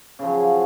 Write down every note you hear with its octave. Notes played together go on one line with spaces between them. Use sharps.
C#3 F3 F#3